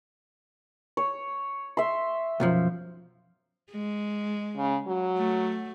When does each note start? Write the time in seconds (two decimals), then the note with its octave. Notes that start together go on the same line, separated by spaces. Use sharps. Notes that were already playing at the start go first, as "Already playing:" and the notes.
0.97 C#5
1.77 E5 C6
2.40 B1 F#2 F3
3.72 G#3
4.57 C#3
4.87 F#3
5.17 A3